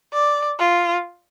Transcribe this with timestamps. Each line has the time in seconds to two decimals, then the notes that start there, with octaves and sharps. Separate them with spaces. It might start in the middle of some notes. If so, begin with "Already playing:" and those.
0.13 D5
0.59 F4